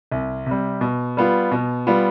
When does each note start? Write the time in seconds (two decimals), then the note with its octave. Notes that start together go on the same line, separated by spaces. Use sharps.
0.12 C2
0.46 C3 G3
0.81 B2
1.17 G3 B3 F4
1.51 B2
1.87 G3 B3 F4